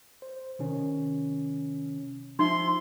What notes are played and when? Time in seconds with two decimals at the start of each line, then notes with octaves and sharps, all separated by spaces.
0.22 C5
0.59 C3 D#3 C#4
2.39 F3 D#4 E5 C6